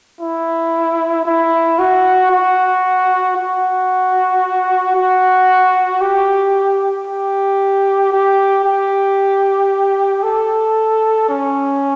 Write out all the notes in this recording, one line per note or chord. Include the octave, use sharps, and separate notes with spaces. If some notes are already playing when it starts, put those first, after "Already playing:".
E4
E4
F#4
F#4
F#4
F#4
G4
G4
G4
G4
A4
C#4